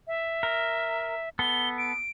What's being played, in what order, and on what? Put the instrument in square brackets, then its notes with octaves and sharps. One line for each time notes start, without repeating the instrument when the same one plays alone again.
[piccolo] E5
[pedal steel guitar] A#4
[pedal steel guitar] B3 A4 [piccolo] G7
[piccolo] D7